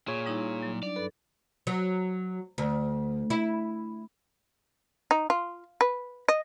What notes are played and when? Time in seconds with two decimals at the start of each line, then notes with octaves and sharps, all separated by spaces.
0.08 A#2 F4 G#4 C#5
0.26 G3 D#4 E4
0.62 F#3
0.83 D4 D5
0.96 G2 A4 B4
1.67 F#3
2.58 D2
3.30 E4
5.11 D#4
5.30 F4
5.81 B4
6.29 D#5